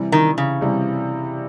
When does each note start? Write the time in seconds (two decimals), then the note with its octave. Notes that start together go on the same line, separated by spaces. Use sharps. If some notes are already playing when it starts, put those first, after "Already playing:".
Already playing: C3 E3 G3
0.12 D#3
0.38 C#3
0.61 C3 E3 G3